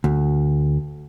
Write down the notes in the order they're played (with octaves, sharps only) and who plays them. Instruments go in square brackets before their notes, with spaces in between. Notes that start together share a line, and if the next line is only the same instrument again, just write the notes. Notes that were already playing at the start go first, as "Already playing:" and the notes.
[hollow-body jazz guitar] D2